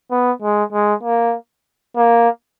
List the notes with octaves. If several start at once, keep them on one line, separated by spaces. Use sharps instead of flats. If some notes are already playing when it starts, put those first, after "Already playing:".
B3
G#3
G#3
A#3
A#3